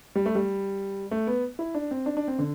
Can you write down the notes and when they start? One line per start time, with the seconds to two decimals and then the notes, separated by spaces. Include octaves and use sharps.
0.15 G3
0.26 A3
0.35 G3
1.11 A3
1.27 B3
1.59 E4
1.74 D4
1.91 C4
2.06 D4
2.17 D4
2.28 C4
2.39 D3